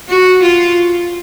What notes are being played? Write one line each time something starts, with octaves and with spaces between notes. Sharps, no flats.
F#4
F4